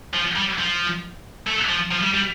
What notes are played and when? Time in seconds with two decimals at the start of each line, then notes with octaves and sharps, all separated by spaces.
0.13 F3
0.35 G3
0.58 F3
1.47 A3
1.69 F3
1.91 F3
2.03 G3
2.14 G3